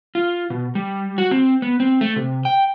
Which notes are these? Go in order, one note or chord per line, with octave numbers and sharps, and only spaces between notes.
F4
B2
G3
F#4
C4
B3
C4
A3
C3
G5